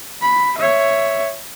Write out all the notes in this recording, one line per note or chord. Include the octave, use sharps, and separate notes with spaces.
B5
C#5 E5